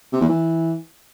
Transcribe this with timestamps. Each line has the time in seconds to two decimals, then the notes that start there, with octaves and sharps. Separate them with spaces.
0.13 C3
0.21 E2
0.29 E3